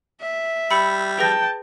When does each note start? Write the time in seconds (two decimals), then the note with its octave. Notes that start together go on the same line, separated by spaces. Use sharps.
0.21 E5
0.71 G3 B5 E6 C#7
1.19 G#4 B4 G5 A5 A#6